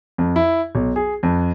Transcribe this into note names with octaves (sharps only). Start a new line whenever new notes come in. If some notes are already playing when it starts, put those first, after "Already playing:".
F2
E4
B1
G#4
F2